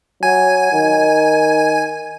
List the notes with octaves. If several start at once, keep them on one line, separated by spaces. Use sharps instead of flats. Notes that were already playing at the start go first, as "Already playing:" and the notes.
F#3 G#5
D#3